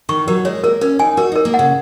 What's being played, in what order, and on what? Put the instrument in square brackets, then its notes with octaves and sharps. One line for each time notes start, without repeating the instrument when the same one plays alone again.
[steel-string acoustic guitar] D#3 [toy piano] C#6
[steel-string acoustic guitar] F#3 [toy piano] A#4
[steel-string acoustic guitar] G#3 [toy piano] C#5
[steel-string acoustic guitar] A#3 [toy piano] A#4
[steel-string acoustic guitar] C#4 [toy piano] A#4
[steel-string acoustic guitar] D#4 [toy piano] G#5
[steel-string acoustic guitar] F#4 [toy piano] A#4
[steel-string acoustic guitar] D#4 [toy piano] A#4
[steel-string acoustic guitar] A#3
[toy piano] F#5
[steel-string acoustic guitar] C#3